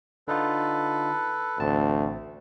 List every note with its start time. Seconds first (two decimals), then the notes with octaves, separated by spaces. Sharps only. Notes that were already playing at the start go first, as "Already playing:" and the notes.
0.28 D3 D#4 F4 A4 B4
1.60 A1 D2 C4 A5